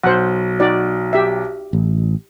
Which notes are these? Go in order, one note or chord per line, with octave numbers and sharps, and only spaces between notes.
B1 C5 F#5
D#4 F#4 D5
G4 E5
A1